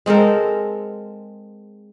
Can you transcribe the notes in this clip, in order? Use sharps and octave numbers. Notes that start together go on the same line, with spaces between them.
G#3 C4 A4 A#4